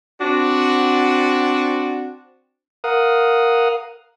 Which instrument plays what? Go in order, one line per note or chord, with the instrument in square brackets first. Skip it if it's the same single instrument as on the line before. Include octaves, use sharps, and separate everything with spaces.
[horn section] C4 D4 F#4
[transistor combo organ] A#4 F5 F#5 D#6